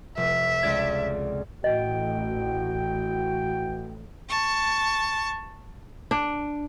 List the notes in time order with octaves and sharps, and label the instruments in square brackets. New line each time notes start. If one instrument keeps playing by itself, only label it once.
[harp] F1 [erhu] E5
[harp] C#2 D5 G#6
[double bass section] A1 [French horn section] E3 F#4 [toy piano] D#5 [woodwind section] G5
[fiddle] A5 C#6
[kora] D4